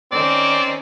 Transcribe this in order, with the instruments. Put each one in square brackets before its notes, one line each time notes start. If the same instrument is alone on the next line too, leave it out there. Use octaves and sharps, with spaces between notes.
[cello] D#3 C#4 [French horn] C4 [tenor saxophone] D5